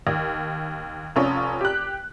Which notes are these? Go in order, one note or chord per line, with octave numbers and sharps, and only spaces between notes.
D#2
F1 C#4 F4
G4 F#6